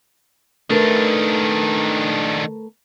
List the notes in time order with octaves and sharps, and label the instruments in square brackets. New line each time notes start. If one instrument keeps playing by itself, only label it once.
[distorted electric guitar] D#3 D4 [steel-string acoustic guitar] A3 A#4 B4